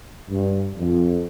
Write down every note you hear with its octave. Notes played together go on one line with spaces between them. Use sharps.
G2
F2